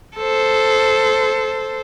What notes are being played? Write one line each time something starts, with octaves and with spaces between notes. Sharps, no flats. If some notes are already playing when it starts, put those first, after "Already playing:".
A4 C5